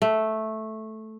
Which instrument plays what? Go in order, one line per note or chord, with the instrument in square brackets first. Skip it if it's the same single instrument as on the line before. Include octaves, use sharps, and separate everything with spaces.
[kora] A3